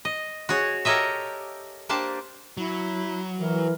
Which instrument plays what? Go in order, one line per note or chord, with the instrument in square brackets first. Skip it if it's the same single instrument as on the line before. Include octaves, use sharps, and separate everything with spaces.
[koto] D#5
F#4 G#4 C#5
G4 A4 A#4 C#5 D#5 E5
A#3 D4 G4 C5 A5
[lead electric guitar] F#3 [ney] E4
[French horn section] E3 [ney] A#4